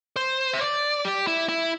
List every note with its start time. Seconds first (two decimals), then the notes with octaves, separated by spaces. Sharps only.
0.16 C5
0.53 E5
0.61 D5
1.05 G4
1.27 E4
1.49 E4